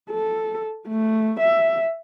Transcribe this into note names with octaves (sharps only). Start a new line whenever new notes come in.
A4
A3
E5